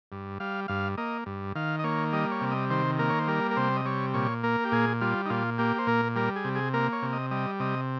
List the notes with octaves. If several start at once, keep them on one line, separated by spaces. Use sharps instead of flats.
G2
G3 F5
G2 F5
A#3 D#5
G2
D#3 F5
D#5
A#3 C#5
G3 D#5
C#5
C3
D#5
D#3 C5
A#3 A#4
C#5
C5
G3 A#4
A#4
C3 C5
D#5
G3 C#5
A#2 C#5
A#3 A#4
G4
A#2 G#4
G3 F4
D#4
A#2 F4
A#3 G4
C5
A#2 A#4
G3 A#4
G#4
C3
G#4
A#3 A#4
C#5
C3
D#5
G3 D#5
C3 D#5